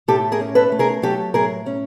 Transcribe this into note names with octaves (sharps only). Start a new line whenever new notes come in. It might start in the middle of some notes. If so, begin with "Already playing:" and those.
A2 G4 A4
G#4 A#4
C#4
A4 B4
A3
G#4 A#4
F#3 G4 A4
A2 G#4 A#4
C#4